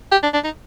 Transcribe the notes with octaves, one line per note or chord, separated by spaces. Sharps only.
G4
D4
D4
D#4